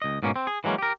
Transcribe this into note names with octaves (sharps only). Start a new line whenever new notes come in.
C#2 D#5
G#2 B2 A#3 C#4
C4
G#4
E3 F#3 G#3 A#3 C#4
G4 A#4